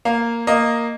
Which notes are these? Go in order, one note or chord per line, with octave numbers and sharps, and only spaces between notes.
A#3 F5
A#3 D#5